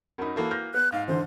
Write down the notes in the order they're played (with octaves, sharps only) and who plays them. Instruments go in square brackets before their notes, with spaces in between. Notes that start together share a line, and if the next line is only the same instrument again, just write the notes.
[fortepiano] F#2 D#4 [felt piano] A#4 B5
[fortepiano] E3 A#3 F#4 [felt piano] A4 B5
[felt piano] F6 G6 A#6
[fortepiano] B3 [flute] F#6
[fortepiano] G#2 [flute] F5
[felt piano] D3 E3 [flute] C5